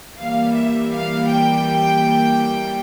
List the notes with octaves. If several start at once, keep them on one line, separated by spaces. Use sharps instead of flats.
E3 G3 A#3 F5
E5
F5
G5